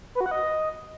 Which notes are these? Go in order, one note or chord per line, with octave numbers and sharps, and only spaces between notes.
B4
F#4
F#5
D#5